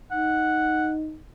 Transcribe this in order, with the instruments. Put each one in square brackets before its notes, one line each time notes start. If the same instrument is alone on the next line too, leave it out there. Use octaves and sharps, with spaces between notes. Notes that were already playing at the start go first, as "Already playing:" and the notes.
[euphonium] D#4 [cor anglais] F#5